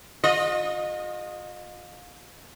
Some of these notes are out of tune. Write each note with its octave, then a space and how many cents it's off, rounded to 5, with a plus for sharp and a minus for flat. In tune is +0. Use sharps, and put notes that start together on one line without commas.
F4 +35 D#5 -20